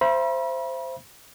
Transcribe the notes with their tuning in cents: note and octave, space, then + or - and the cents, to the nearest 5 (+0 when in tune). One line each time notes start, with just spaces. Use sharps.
C5 +0 E5 +35 B5 -40